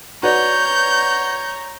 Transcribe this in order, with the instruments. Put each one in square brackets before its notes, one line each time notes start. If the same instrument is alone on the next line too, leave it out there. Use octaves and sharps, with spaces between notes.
[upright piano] F#4 B4 D5 [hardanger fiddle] C#5 [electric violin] A#5 [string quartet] G6